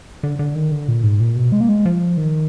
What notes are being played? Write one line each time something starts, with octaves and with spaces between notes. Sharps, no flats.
D3
D3
D#3
D3
A#2
G#2
A#2
B2
G#3
A#3
G#3
F3
D#3